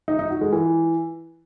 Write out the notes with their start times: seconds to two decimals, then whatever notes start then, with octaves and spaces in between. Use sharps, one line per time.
0.08 D#4
0.19 D#4
0.30 F#4
0.41 G#3
0.52 E3